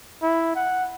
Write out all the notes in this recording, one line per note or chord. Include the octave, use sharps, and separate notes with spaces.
E4
F#5